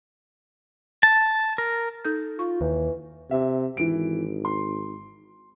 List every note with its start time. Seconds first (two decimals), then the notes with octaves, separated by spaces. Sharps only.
1.03 A5
1.58 A#4
2.05 D#4 A4 G6
2.39 F4 C#6
2.61 D#2 E3
3.31 C3 E5
3.77 G#1 E3 D7
4.45 C6